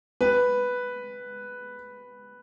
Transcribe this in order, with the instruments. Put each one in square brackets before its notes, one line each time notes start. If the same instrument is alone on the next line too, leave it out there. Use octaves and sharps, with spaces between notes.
[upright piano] B4